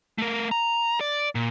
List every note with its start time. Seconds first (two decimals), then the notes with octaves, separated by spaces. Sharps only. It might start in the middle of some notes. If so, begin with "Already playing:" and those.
0.18 A3 A#4
0.51 A#5
1.01 D5
1.35 A#2